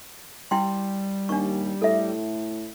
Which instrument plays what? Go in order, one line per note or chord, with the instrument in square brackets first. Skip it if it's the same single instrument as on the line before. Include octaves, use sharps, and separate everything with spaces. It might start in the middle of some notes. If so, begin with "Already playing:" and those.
[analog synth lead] G3 [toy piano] E4 G5 C6
[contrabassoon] D#2 [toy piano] D4 C#6
[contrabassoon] A2 [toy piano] A4 E5